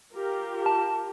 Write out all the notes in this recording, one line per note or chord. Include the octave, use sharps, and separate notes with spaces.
F4 G4 A#4
A5